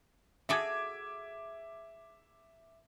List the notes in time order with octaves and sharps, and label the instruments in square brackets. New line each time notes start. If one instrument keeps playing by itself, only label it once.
[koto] F#4 G#4 A4 [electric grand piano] E5 D6 G#6